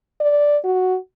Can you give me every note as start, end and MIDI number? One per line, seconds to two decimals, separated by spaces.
0.20 0.57 74
0.64 0.97 66